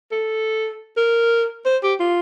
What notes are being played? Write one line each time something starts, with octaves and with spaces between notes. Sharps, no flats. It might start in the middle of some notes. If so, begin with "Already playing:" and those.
A4
A#4
C5
G4
F4